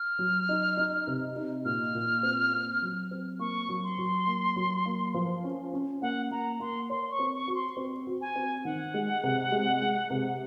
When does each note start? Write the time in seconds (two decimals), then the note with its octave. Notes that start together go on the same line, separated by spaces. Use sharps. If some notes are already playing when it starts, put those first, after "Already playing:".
Already playing: F6
0.19 F#3
0.49 D#4
0.77 D#4
1.07 C3
1.36 D#4
1.65 A#2 F6
1.95 A#2
2.23 C4
2.52 C4
2.82 F#3
3.11 C4
3.39 A#3 C#6
3.69 F#3
3.84 C6
3.98 F#3
4.27 A#3
4.56 F#3
4.86 A#3
5.14 F3
5.44 C#4
5.73 C#4
6.02 A#3 F#5
6.31 A#3 A#5
6.60 A#3 C6
6.90 C#5 C6
7.11 C#6
7.19 C4
7.34 C#6
7.48 F#4
7.55 C6
7.77 C4
8.07 F#4
8.21 G#5
8.36 C4
8.65 D#3 F#5
8.94 G#3
9.23 C3
9.52 G#3
9.81 G#3
10.10 C3